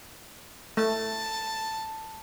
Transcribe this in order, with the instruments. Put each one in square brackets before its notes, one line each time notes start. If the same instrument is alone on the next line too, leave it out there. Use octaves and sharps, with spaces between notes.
[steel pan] A3 [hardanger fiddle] A5